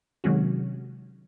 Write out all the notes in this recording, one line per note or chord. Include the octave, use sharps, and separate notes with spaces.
C3 D#3 F#3 G#3 C#4 F#4